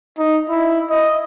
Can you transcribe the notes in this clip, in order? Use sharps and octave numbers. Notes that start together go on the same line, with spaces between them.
D#4
E4
D#5